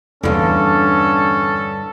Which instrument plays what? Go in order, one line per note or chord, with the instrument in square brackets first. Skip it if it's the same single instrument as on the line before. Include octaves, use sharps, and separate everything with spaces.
[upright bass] E2 B3 [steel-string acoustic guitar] G2 D3 [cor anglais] C#4 [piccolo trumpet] A4